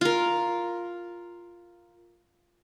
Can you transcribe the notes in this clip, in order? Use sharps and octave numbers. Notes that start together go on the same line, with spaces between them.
F4 A#4